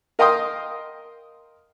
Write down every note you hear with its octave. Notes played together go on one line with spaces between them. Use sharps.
A#4 D#5 F5 G5 C6 D#6